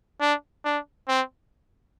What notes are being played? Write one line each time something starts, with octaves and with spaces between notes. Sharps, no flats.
D4
D4
C4